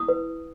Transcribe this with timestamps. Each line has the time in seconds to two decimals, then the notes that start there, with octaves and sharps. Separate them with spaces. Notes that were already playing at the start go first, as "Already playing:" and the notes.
Already playing: E4 D#6
0.08 B4